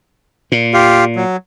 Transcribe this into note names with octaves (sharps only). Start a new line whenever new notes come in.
A#2
F4 G4 F5
F#3